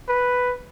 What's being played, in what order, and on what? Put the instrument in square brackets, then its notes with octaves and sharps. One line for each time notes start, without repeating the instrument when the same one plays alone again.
[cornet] B4